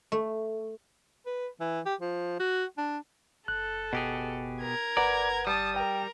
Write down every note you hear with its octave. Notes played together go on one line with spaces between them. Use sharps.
A3
B4
E3
G4
F3
F#4
D4
F#1 A4 F#6
B2 G4 G#4
A#4 G#6
G1 B4 D5 F#5 A#5
G3 A5 D#6
A#4 G5